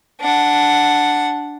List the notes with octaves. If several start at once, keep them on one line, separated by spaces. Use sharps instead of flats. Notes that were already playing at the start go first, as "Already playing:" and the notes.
D4 F#5